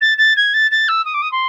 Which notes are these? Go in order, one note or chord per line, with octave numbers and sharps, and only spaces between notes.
A6
A6
G#6
A6
A6
E6
D#6
D6
D#6
C6